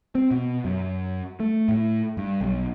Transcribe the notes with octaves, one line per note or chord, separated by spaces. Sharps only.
C4
B2
F#2
A3
A2
G2
B1